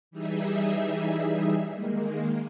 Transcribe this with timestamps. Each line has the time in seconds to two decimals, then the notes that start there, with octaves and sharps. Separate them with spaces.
0.11 E3 G3 D#4 G#4 E5
1.72 D#3 G#3 A#3